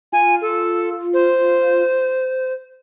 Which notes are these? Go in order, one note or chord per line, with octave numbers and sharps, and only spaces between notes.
F4 G#5
A4
C5